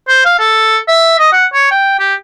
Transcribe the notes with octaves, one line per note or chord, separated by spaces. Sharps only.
C5
F5
A4
E5
D#5
F#5
C#5
G5
G4